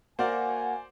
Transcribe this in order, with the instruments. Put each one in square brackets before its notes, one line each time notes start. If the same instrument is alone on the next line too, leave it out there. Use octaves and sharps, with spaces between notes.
[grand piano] A#3 A#4 [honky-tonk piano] F#4 [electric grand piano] C5 D5 [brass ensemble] G#5